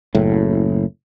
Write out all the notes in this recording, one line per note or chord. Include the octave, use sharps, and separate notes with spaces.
F#1 A2